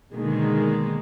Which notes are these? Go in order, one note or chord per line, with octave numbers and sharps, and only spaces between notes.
B2 D3 D#3 G#3 A#3